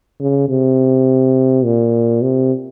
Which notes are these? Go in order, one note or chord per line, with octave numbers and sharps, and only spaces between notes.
C#3
C3
A#2
C3